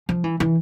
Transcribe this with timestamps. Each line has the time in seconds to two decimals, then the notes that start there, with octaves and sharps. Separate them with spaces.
0.09 F3
0.24 E3
0.40 E3